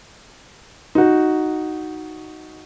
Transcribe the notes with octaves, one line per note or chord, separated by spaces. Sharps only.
D#4 F#4